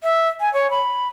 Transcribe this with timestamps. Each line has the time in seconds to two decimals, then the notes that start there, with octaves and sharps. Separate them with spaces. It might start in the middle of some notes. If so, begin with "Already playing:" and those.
0.03 E5
0.40 G#5
0.54 C#5
0.71 B5